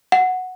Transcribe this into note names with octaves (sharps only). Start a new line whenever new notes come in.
F#5